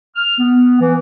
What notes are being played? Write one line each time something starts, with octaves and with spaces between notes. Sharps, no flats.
F6
B3
E3